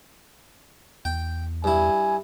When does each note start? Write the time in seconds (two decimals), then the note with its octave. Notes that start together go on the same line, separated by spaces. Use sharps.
1.05 E2 G5
1.64 G2 E4 G#5